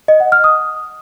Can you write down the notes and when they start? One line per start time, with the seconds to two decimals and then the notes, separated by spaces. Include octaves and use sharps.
0.08 D#5
0.20 F#5
0.32 F6
0.44 D#6